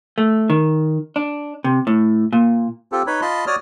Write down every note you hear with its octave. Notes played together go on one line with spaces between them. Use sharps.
A3
D#3
D4
C3
A2
A#2
C4 F4 G4 A4
D#4 B4 C#5 B5
F4 D#5 A5 B5 C6
F#4 C#5 D5 D#6 F6